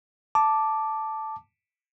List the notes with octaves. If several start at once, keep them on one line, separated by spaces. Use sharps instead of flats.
A5 D6